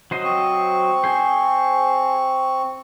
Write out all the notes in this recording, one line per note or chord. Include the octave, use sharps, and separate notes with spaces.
F#3 C5 D#5
C4 C#6
G#4 C5